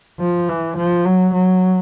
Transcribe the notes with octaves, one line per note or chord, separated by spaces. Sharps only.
F3
E3
F3
F#3
F#3